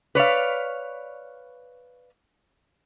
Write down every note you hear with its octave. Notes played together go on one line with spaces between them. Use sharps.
B4 C#5 D5 F5